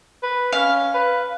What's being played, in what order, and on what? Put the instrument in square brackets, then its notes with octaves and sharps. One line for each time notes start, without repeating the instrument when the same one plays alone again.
[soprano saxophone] B4
[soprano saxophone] C#4 [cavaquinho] F5
[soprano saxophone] B4